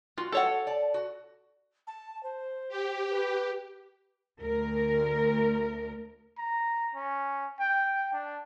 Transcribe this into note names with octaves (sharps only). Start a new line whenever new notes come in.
F4 F#4
A4 C#5 F#5
D5 A5
F#4
A5
C5
G4
B4
D2 A#4
A#5
C#4
G5
D4